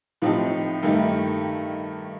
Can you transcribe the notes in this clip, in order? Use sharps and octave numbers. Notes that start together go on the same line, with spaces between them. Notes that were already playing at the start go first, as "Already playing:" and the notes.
A2 F3 C4 D#4 G4
G2 D#3 A3 D#4 G4